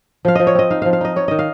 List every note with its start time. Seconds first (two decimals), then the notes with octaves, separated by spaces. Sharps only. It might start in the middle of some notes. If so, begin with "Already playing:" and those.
0.25 F3 F5
0.35 F3 D#5
0.47 C#5
0.55 C4 D#5
0.70 D#4 F5
0.82 F3 F5
0.93 F5
1.01 D#4 D#5
1.16 D#4 C#5
1.28 D#3 D#5
1.39 F5